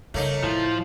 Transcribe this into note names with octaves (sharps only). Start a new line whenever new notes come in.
C#3 G3 A3 A#3 D#4 C#5
A2 F3 E4